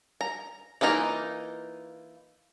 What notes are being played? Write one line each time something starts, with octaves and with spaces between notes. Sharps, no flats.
A#5
E3 A#3 D#4 F4 A#5